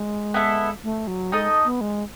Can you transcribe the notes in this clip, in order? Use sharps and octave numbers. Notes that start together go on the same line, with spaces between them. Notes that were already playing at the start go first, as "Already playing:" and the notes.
Already playing: G#3
B3 E4 A4 E5
A3
F#3
G#3 D#4 A4 D#5
B3
G#3